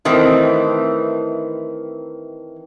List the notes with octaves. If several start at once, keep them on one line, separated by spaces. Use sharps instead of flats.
D#3 E3 A3 C4